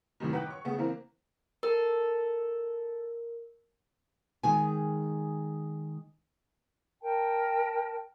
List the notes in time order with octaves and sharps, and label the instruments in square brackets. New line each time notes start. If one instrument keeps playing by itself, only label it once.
[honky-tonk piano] F#2 A2 C3 D#3
D#4 B4 F#5 G5 D6 F#6
C#5 C#6
C#3 A3 B3
E3 A#3 C4 A#4
[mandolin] A4 [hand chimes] A#4
[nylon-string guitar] D#3 G#3 G#4 G#5
[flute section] A#4 G5 A5